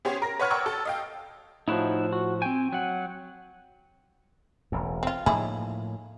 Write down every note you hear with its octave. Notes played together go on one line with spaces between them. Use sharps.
B3 C#4 G4 G#4 C5 C#5
A#4 A#6
B4 C#5 F#5 C#6 F6 G#6
A#4 D5 F#5 G5 C#6 E6
A4
D#5 F5 G5
A2 F3 D#4 E4 F#4
F#4
C4 G5 G#5
F#3 F#5
E1 A1 E2
C4 F4
A2 D#3 F3 A#3 E4 G#4